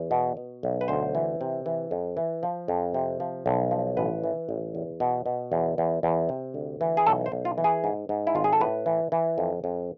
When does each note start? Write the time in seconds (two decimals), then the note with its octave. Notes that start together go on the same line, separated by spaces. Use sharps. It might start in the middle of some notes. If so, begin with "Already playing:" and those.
Already playing: E2
0.11 B2
0.37 B2
0.63 B1
0.81 B4
0.88 D2 C5
1.15 E3
1.41 C3
1.66 E3
1.91 F2
2.17 E3
2.43 F3
2.68 F2
2.94 C3
3.20 F3
3.46 B1
3.71 F3
3.97 A1 B4
4.24 E3
4.49 A1
4.75 E2
5.00 B2
5.26 B2
5.52 E2
5.78 E2
6.03 E2
6.29 C3
6.54 D2
6.81 E3
6.97 G#4
7.06 B1 A4
7.26 C5
7.32 B1
7.45 F4
7.58 E3
7.64 G#4
7.84 G#2
8.09 G#2
8.27 E4
8.35 G#1 F4
8.44 G#4
8.53 A4
8.61 A2 B4
8.86 E3
9.12 E3
9.38 F2
9.64 F2